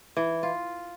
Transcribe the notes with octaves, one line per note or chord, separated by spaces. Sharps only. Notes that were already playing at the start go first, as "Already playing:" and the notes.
E3
F4